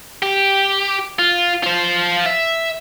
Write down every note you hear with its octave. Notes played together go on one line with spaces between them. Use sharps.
G4
F4
F4 C5
E5